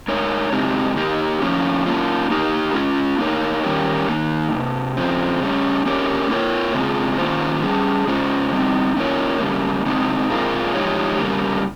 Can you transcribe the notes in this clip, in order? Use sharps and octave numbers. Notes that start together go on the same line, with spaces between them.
G#3 D#4 A#4 C#5
C#3 G#3 C4 D#4 G4
A#3 D#4 G4
F3 A#3 C#4
A#3 C#4 F4
A#3 D#4 G4 A#4
G#3 C#4 F4
A#3 D#4 A#4 C#5
D#3 G3 C#4 G4 A#4
D#3 A#3 D#4
C3 D#3 A#3
C#3 F3 C4
C#3 G3 C#4
A#3 C#4 G4 A#4 C#5
A#3 F4 A#4 C#5
C#3 G#3 C4 F4 G#4
D#3 A#3 C#4 F4 C5
G3 C#4 G#4
C#3 G#3 C#4 F4 C5
G3 C4 D#4
A#3 C#4 F4 A#4 C#5
C#3 G3 A#3
C#3 G#3 C4 D#4
A#2 G#3 C4 F4 A#4
F3 G#3 D#4 G4 C#5
C#3 G3 A#3